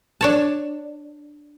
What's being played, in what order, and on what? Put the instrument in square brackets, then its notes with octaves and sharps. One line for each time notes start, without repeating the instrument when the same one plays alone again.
[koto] D4 C#5 A5